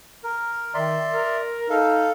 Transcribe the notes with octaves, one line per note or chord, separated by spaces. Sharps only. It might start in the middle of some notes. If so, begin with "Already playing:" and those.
A#4
D#3 D5 E5 C6
A#4
D#4 A4 F5